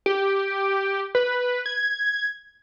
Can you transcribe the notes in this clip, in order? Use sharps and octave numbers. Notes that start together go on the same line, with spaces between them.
G4
B4
G#6